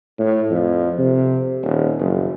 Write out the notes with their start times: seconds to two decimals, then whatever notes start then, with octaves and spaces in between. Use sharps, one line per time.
0.19 A2
0.51 F2
0.98 C3
1.63 D#1
2.00 F#1